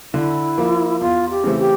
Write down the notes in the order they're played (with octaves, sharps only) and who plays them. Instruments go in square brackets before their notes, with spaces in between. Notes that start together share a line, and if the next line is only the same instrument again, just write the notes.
[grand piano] D3 [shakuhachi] E4
[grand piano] F3 A#3
[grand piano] E2 [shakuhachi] F4
[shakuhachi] G4
[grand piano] C#3 E3 A3 C4
[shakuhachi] G4